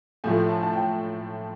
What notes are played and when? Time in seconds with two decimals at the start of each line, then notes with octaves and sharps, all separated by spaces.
0.24 A2 F3 A3 G#5
0.49 A5
0.56 G#5
0.63 A5
0.73 G5